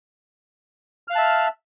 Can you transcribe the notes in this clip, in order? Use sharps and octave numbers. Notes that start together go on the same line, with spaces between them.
E5 F5 A5 F6 F#6